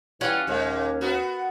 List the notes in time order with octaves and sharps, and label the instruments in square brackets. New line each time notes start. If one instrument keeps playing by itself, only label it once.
[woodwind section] E3 G3 [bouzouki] C#4 F#5 [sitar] F4
[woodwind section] D#2 [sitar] A#2 G#3
[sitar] B3 F#4 A#4